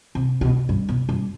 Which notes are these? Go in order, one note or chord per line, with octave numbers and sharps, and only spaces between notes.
C3
B2
G2
B2
G2